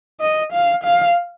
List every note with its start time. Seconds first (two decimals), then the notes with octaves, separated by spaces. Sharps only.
0.21 D#5
0.52 F5
0.84 F5